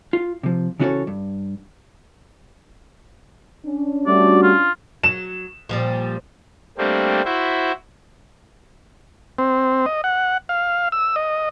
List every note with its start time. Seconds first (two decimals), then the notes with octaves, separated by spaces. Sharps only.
0.13 F4
0.43 C3 F3
0.79 C#3 E3 C#4 F#4 A4 C#5
1.07 G2
3.66 C#4 D4
4.07 G3 A3 F#4 D5
4.43 F4
5.03 F#3 E7
5.69 A#2 F3 G3
6.78 G3 A3 A#3 C4 D4 G4
7.25 E4 F#4 C5 E5
9.39 C4
9.86 D#5
10.04 F#5
10.49 F5
10.92 E6
11.16 D#5